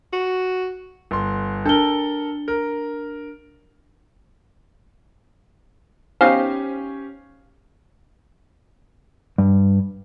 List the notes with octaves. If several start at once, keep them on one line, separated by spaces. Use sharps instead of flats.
F#4
G1 C6
D4 A4 A#4 G7
A#4
B3 C#4 D#4 G4 C5 F5 G#5
G2